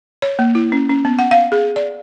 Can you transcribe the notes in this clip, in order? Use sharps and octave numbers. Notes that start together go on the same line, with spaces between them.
C#5
A#3
E4
C#4
C#4
B3
F#5
F5
G#4
D5